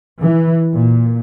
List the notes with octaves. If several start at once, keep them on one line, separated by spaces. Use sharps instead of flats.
E3
A#2